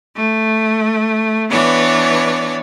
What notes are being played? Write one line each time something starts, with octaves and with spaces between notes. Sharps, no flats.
A3
E3 B3 D4 C#5 D5